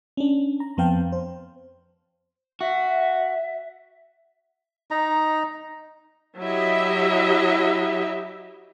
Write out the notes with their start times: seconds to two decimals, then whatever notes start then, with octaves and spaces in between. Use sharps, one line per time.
0.17 C#4 D4
0.60 A#5
0.77 F2 B3 C4 F5 G5 A5
1.12 C5
2.61 F#4 E5
4.91 D#4 A#5
6.40 F#3 E4 G4 D#5 E5